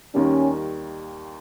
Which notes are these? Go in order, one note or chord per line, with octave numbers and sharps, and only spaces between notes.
D#2 D#3 G3 A#3 C#4